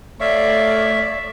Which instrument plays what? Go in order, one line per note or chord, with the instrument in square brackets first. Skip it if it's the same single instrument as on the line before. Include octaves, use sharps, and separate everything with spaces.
[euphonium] A3 [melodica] C#5 F5 [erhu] D5 [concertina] E5